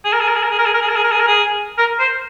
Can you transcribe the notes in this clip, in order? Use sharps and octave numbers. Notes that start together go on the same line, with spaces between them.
G#4
A#4
G#4
A#4
G#4
A#4
G#4
A#4
G#4
A#4
G#4
A#4
G#4
A#4
G#4
A#4
G#4
A#4
C5